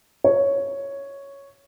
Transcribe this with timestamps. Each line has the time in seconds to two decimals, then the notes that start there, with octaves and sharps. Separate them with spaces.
0.24 C#5